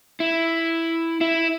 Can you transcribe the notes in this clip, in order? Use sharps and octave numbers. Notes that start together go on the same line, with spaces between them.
E4
E4